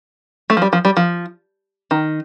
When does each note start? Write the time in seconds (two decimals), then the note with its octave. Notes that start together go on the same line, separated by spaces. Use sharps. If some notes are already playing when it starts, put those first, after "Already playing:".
0.50 A3
0.57 F3
0.62 G3
0.73 F3
0.85 G3
0.97 F3
1.91 D#3